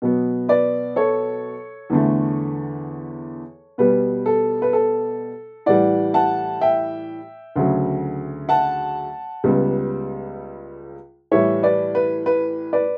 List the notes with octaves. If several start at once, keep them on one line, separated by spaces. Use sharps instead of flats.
B2 F#3 B3
B4 D5
A4 C#5
E2 D3 A3
B2 G3 B3 B4
A4
B4
A4
A2 E3 G3 D5 F#5
F#5 A5
E5 G5
D2 C#3 F#3
F#5 A5
C#2 C#3 G3 B3
A2 E3 G3 C#5 E5
B4 D5
B4
B4
B4 D5